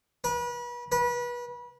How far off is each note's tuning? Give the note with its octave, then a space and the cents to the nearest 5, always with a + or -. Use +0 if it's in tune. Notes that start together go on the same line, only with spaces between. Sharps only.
B4 -35
B4 -30